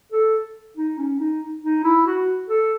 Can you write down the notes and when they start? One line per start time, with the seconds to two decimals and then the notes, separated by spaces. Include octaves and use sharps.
0.12 A4
0.77 D#4
0.98 C#4
1.20 D#4
1.63 D#4
1.84 E4
2.06 F#4
2.49 A4